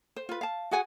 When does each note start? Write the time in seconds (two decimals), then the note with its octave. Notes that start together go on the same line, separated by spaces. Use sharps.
0.16 C5
0.29 F4 B4
0.41 F5 A5
0.71 F#4 G#4 F#5 G#5